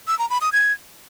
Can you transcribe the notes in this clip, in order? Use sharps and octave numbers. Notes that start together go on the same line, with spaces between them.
E6
A#5
B5
D#6
G#6